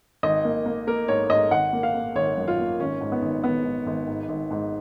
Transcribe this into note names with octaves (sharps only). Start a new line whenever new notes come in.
G#1 D#5
A#3
A#3
A#3 A#4
G#2 C#5
G#2 D#5
G#1 F#5
A#3
F5
A#3
G#1 C#5
F#2
F4
A#3
G#1 C#4
G#2
B3
G#1
G#1 B3
G#2
G#1
G#2
G#1
G#2